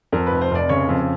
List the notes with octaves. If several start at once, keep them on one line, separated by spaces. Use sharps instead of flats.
F2 A#4
F1 B4
C5
F1 D5
C#3 C#5
F2